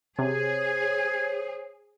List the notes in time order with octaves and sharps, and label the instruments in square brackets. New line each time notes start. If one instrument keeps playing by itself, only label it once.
[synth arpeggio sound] C3 [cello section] G#4 [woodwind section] C5 C#5 [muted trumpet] G#5